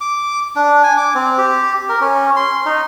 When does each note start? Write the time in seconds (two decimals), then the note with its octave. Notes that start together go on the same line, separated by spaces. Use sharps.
0.01 D6
0.56 D4
0.83 G#5
0.97 D6
1.15 C4
1.38 G4
1.89 A#4
2.01 C#4
2.36 C6
2.66 D#4